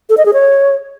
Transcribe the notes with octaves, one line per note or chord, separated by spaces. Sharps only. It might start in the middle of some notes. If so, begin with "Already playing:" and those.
A4
D#5
G#4
C#5